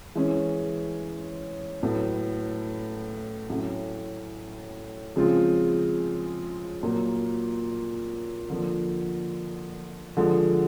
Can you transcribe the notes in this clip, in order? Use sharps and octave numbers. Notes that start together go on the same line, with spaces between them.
E3 G#3 C#4
A2 F#3 B3
A2 F#3 A3 C#4 F#4
C#3 F3 G#3 C4 F4
A#2 F#3 A#3
D3 F3 A#3
D3 F3 G#3